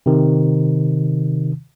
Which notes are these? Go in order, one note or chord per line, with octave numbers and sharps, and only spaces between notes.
C3 D#3